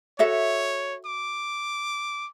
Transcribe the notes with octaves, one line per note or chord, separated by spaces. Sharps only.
F#4 A4 C#5 E5
D6